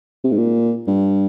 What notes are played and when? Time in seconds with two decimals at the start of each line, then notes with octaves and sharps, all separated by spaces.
0.24 C3
0.32 G#2
0.37 A#2
0.87 G2